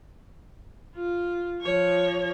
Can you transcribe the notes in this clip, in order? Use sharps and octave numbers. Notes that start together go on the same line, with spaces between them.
F4
F3 C#5